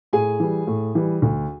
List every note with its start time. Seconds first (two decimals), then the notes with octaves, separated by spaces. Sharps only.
0.13 A2 G#4 G#5
0.40 E3 G3
0.67 A2
0.95 E3 G3
1.22 D2